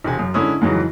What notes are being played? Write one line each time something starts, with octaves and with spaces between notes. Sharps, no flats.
E1 C3 G#5
F#2
G#2 D3 C#4 E4 D#6
F2 G#2 C#3 E3 F#3